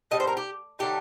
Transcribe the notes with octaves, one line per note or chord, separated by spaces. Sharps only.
A2 G3 C4 D#5
C5
A#4
G4
D3 F#3 A3 D#4 G4